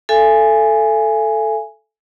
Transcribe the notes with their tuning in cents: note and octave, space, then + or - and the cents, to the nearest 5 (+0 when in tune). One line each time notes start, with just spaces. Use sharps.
A4 +0 E5 +45 G#5 +0